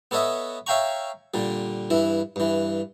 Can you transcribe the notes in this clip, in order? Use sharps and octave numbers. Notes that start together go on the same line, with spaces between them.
B3 A4 C#5 D#5 E5
C#5 E5 F5 G5 A#5 C#6
A#2 D3 G3
G2 E3 E4
G2 E3